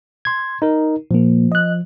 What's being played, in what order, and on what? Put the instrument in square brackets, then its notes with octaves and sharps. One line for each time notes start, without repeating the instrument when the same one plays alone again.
[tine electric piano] C6 G#6
D#4 A#4
[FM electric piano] A#2 A#3 [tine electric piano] F3
[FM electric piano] D#5 F#6